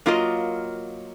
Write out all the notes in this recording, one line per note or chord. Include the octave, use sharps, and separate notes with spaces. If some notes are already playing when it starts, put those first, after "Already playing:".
F#3 A#3 F4 A#4 D#5